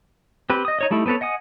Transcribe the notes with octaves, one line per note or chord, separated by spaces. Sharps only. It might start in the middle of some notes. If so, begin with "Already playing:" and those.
C4 G4 B4
D#5 D#6
D#4 C#5 D#5
G3 A3 D#4 E4
B3 C4 A4 B4 C#5
D#5 F#5 G#5 D#6